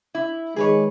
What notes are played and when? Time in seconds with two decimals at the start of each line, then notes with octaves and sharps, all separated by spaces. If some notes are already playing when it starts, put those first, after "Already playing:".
0.15 E4
0.56 D#3 G#3 G#4 B4 C#5